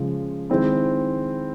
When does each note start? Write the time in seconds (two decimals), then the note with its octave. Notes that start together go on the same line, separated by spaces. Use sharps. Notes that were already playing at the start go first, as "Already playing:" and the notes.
Already playing: C#3 F3 G#3
0.50 D#3 G#3 C4 E4